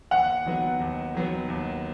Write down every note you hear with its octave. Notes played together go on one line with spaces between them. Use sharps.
D#2 F#5
D#3 F#3 B3
D#2
D#3 F#3 B3
D#2